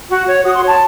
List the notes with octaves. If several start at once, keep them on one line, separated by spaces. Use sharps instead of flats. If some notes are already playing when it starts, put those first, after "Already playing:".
F#4
C#5
F#4 D#6
C6
C#5
A5